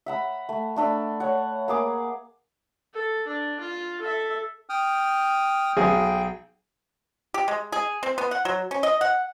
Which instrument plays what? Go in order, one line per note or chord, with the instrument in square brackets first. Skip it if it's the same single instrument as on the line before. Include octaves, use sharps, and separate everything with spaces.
[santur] E5 F#5 B5
A3
A3 D4 A4 B5
C#5 F#5
A#3 G#4 D6
[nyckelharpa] A4
D4
F4
A4 E5
[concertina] G5 D#6 F6
[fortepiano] B1 G#4 [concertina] G5
[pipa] G4
G#3
G#4
C4
B3
F#5
F#3
C#4
D#5
F#5